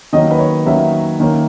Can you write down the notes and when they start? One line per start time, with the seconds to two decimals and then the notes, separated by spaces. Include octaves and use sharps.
0.13 D#3 F#3 A#3 C#4 D#5
0.31 B4
0.39 C#5
0.66 D#3 F#3 A#3 C#4 E5
1.20 D#3 A#3 C#4